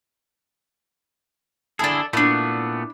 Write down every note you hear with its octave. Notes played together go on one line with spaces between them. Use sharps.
D3 D4 E4 G#4 A4
A#2 A3 B3 D4 E4